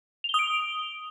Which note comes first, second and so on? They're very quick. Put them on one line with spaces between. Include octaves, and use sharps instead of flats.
F7 G7 D#6 D7